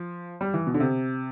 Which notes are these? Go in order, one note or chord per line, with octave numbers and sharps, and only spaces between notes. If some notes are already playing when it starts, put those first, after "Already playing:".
Already playing: F3
G3
E3
B2
D3
C3